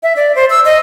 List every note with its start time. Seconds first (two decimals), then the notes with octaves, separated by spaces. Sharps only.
0.03 E5
0.16 D5
0.36 C5
0.50 E6
0.65 D#5